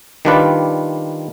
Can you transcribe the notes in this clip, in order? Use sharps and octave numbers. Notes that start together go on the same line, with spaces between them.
D#3 G3 D4 F4 B4 D5